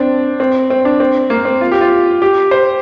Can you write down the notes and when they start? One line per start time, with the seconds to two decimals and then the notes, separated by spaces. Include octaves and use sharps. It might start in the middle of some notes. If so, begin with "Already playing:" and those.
Already playing: C4 D4
0.40 C4
0.70 C4
0.85 D4
1.00 C4
1.30 A#3
1.45 C4
1.61 F4
1.72 G4
1.81 F4
2.22 G4
2.51 C5